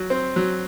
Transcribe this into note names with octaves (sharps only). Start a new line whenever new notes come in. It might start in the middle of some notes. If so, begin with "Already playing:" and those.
Already playing: F#3
C4
F#3